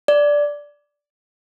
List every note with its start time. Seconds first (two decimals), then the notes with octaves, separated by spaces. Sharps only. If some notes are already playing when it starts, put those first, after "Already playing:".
0.08 D5